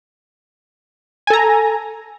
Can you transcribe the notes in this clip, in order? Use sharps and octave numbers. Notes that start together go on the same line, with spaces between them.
A4 G#5 A#5